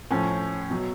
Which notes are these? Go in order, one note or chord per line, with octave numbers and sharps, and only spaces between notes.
A2 F3 C#4
B2 F#3